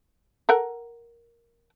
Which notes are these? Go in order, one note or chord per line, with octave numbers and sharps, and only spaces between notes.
A4 A#4 F#5